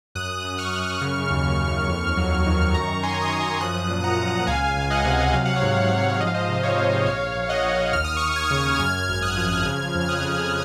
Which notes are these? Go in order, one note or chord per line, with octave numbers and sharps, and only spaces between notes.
F#2 D#6 F#6
F#2
D#6
C#6 F6
F#2
C#3
D#2
D#2
F2
F#3
D#3
F#2 A#5 C#6
D#3 G#5 C6
D#6
F#2 A#5 C#6
F3 D#6 F#6
A#2
F#5 A#5
A#2
F#5
C#2 F5 G#5
C#2
D#5 F#5
C3
F#3 F5
F#5
C#5 F5
G#2
F5
G#2 F#5
C#5 F5
F3 D#5
F5
C5 D#5
C3
C#5 F5
C3
A#1 C#5 F5
A#1
D#5 F#5
A#1
D#2 F6
D#6
D#2 C#6 F6
F6 G#6
C#3
F#2 F6 G#6
G#1
F6
D#6 F#6
F3
F#6
C#3 F6 G#6
F2
F6
D#6 F#6
F3